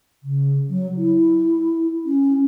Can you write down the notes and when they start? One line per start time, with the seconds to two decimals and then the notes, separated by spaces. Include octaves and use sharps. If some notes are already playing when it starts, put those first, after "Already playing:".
0.23 C#3
0.70 F#3
0.97 E4
2.05 C#4